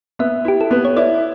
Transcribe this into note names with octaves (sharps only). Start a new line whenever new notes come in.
B3 E5
E4 G4
A4
B3 B4
C#5
E4 D5